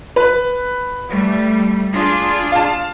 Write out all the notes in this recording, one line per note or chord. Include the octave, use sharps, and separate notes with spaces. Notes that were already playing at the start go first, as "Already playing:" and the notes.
B4
G3 A3
D4 F4 G#4
F5 A5